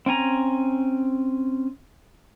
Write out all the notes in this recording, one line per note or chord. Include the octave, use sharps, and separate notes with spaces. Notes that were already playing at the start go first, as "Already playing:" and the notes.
C4 C#4 G#5 A#5